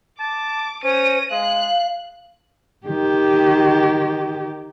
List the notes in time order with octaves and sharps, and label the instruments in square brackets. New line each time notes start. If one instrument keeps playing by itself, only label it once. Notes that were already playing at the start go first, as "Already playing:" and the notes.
[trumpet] A5 [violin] D6
[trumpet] C#4 [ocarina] C5 [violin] A#6 D#7
[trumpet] G#3 [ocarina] F5 [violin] F#6
[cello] D#3 G4